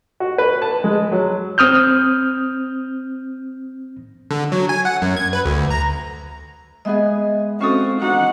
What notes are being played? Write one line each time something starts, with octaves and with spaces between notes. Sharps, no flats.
F#4
B4
A5
G#3
F#3
C4 D#6 F6 G6
D3
F#3
G#5
F#5
F#2
G#6
B4
D2
A#5
G#3 B3 G#4 D#5 E5
C4 C#4 F#4 A4 F5 C#6 D#6
D4 D#4 F#4 F#5